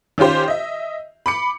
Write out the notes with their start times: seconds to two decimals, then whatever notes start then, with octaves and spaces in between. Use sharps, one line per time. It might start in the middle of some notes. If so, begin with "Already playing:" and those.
0.18 D#3 C#4 F4 G4 C5
0.48 D#5 E5
1.26 B5 D6 C#7